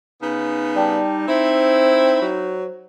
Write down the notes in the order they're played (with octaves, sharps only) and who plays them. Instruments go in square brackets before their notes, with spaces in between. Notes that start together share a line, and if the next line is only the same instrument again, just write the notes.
[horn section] C#3 B3 [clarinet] D#4
[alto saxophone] G3 [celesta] D5 G5 A5
[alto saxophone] C4 [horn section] E4 [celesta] C5
[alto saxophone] F#3